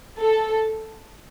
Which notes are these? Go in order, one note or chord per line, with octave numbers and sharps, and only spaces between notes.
A4